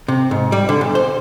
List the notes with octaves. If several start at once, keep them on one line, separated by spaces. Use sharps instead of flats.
C3
G#2
G3
D3
B1
C5